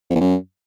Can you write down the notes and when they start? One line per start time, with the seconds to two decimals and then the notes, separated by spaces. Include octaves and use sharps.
0.10 F2
0.16 E2
0.21 F#2